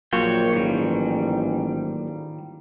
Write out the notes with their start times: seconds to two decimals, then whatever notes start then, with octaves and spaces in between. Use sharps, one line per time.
0.13 A#1 F#3 A#3 F4 C#5 G5
0.53 A1 G#2 D#3 E3 G3